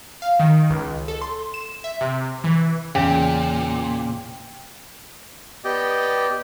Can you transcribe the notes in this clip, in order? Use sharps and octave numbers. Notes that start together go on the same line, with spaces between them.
F5
D#3
C#2
A4
C6
E7
E5
C3
E3
E2 A#2 C#3 G5
B3 G4 D5 D#5 G5